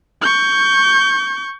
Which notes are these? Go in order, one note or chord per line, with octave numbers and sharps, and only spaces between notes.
C#6 G6